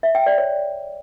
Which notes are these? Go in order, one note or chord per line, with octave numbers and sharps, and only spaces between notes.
E5
G5
D5
C#5